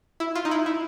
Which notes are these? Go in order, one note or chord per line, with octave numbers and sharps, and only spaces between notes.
E4
F4
D#4
E4
E4